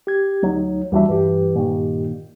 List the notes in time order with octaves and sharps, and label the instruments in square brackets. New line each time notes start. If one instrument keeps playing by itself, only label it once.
[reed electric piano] G4 G#6
[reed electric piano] D2 D#4 [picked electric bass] F#3
[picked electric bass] D#2 E3 D4 [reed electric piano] G3 F#4 E5
[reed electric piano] G2 G4 [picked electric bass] E3
[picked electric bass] A#2 D#3